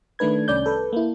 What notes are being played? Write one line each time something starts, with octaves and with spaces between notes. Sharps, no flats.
D#3 A3 D4 B4 G#6
C2 C#4 D5 G6
A4 B4
A#3 E4